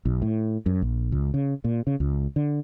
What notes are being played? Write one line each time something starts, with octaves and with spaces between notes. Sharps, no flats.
B1
A2
F#2
A#1
C#2
C#3
A#2
C#3
C#2
D3